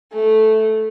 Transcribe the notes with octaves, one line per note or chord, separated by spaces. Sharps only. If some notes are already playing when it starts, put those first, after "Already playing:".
A3